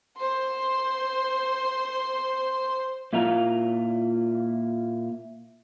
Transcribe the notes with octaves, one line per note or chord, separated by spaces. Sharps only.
C5 C6
A#2 E4 F4 F5 A#5